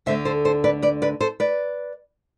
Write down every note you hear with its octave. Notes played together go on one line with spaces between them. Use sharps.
D2 D3 A3 C5 E5
A4 C5
A4 C5
B4 D5
B4 D5
B4 D5
A4 C5
B4 D5